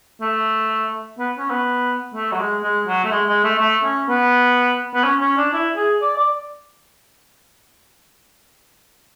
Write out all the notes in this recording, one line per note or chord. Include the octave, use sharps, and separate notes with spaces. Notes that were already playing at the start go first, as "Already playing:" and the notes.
A3
B3
C#4
B3
A3
F#3
G#3
G#3
F#3
A3
G#3
G#3
A3
A3
C#4
B3
B3
C#4
C#4
D4
E4
G#4
D5
D5